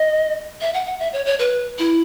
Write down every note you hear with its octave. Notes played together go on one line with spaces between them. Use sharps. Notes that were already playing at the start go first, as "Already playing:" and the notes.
Already playing: D#5
E5
F#5
F#5
E5
C#5
C#5
B4
E4